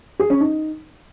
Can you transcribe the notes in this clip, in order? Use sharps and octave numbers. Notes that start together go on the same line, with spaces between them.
G#4
C#4
D#4